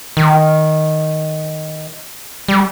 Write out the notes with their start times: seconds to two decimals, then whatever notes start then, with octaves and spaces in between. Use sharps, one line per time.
0.17 D#3
2.48 G3